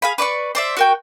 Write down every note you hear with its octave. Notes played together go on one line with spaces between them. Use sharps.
G#4 F5 B5
B4 D5 C6 C#6
C5 D5 E5
F#4 A#4 G5